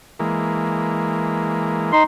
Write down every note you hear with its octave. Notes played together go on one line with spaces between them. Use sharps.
E3 G#3 A#3
D#4 C6